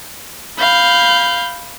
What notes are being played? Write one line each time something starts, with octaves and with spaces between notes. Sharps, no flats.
F5 B5 G6